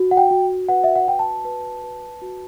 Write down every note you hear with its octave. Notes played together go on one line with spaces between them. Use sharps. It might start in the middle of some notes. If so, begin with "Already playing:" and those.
Already playing: F#4
F#5
G5
F#4
B4 F#5
E5
F#5
F#4 G5
A5
B4
B4
F#4